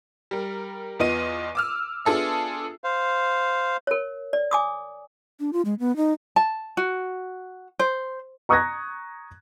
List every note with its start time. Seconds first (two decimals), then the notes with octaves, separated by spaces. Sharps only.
0.31 G3 A#4
0.99 E2 B3 F4 D#5 D#7
1.55 D6 E6 F6
2.05 B3 D4 F4 G#4 A4 E5
2.84 C5 F5
3.87 A#4 C#5
4.33 D5
4.51 G#5 D6 D#6
5.40 D4
5.53 F4
5.65 G#3
5.80 B3
5.96 D#4
6.36 A5
6.77 F#4
7.79 C5
8.49 A#5 C#6 D#6 F#6 G#6 A#6